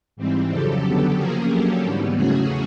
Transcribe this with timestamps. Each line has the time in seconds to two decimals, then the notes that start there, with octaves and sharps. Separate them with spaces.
0.16 G#2 E3 G3 C4
0.50 F2 C#3 F#3 G4 A4
0.84 D3 F#3 B3
1.16 C#3 F3 A#3 C#4 G#4 A#4
1.49 D3 F#3 A#3 C#4 G4 A4
1.83 G#2 E3 G3 B3
2.16 E2 C#3 F#3 A3 C#4 F#4 G#4